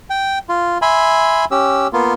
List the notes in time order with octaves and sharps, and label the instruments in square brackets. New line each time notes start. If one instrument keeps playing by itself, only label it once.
[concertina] G5
F4
E5 G#5 B5 C6
C#4 G4 E6
A#3 B3 F4